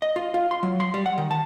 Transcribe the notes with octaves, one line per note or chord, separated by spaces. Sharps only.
D#5
F4
F4
C6
F#3
C6
G3
F#5
D#3
A5